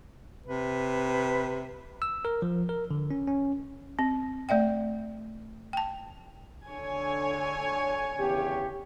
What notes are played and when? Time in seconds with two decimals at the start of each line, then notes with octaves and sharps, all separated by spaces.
0.46 C3 B4
2.02 E6
2.25 A#4
2.42 F3
2.69 A#4
2.91 D3
3.11 C#4
3.27 C#4
3.99 C4
4.49 A3 D5 E5 G5
5.73 G5 A5
6.67 D3 C#5 G#5
8.18 E2 C#3 G4